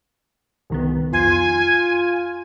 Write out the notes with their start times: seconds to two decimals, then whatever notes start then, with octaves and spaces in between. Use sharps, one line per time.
0.70 C2 D#3 B3
1.13 F2 F4 G#5 C6